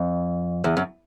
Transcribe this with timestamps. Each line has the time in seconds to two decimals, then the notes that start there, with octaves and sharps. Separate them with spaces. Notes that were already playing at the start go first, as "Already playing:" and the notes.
Already playing: F2
0.64 E2
0.77 F#2